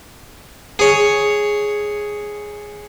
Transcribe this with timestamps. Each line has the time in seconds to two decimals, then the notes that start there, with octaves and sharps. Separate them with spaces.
0.79 G#4 C#5